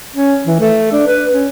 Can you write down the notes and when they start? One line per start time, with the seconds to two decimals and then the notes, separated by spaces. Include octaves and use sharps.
0.16 C#4
0.46 E3
0.60 A3
0.92 D4
1.07 B4
1.32 C#4